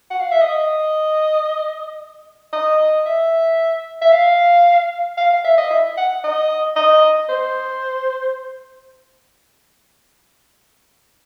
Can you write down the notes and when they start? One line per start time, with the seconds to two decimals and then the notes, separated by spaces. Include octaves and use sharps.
0.10 F#5
0.20 F5
0.32 E5
0.42 D#5
2.53 D#5
3.06 E5
4.01 E5
4.12 F5
5.18 F5
5.31 F5
5.44 E5
5.58 D#5
5.70 E5
5.97 F#5
6.24 D#5
6.76 D#5
7.29 C5